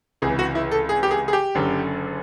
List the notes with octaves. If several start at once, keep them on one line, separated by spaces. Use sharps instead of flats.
C#2 C3 E3 G#4
F#4
E4
A4
G#4
G4
G#4
G#4
G4
F#1 F#2 D3